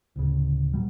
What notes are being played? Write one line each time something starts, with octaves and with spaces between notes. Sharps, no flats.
D1 D2 C#3
A#2 F#3 G3